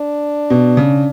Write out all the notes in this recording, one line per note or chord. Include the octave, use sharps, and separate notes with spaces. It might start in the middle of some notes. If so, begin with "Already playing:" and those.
Already playing: D4
B2
C#3